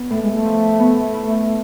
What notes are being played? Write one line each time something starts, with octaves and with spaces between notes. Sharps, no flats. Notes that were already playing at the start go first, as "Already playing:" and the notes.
Already playing: B3
A2 A3
G#3
A3
F3
B3
E4